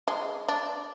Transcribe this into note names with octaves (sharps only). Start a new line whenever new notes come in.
G#3
D4